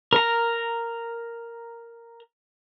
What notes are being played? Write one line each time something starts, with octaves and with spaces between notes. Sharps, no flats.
A#4 A#5